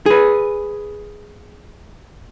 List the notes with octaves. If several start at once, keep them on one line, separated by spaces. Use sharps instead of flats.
G#4 B4